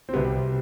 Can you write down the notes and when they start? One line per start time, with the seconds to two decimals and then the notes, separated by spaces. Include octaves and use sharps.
0.09 C4
0.13 C2 B2 G3 B3